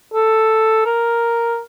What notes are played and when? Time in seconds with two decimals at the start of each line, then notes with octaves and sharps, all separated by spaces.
0.14 A4
0.85 A#4